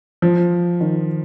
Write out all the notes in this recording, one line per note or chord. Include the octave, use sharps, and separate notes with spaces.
F3
D#3